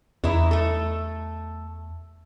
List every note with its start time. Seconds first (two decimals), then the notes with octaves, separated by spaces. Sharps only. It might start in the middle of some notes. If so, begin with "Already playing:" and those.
0.24 E2 E3 D#4 E4
0.51 A3 A4